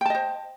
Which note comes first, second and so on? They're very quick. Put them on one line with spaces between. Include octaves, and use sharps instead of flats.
G5 A5 D#5 C5